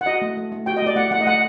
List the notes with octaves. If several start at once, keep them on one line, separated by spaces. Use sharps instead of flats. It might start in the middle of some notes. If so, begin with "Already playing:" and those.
F#5
F#4 D#5
A3
A3
A3
F#4 G5
D#5
A3 D5
A3 F#5
A3 F#5
D#5
A3 F#5